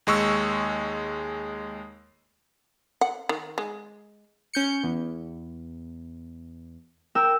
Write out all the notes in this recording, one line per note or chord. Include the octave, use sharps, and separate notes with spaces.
D#2 G#3 C#6 E6
F#5
D#3
G#3
C#4 G6 C#7
E2
A#4 G5 E6